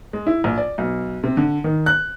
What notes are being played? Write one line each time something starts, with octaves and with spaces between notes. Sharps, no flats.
G#3
E4
A#1
D5
B1
C3
D3
D#3
F#6